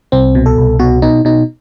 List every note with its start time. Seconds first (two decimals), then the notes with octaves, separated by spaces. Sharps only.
0.12 C2 C4
0.35 B2
0.46 A4
0.58 C2
0.79 B2 F#4
1.02 B2 D#4
1.25 B2 D#4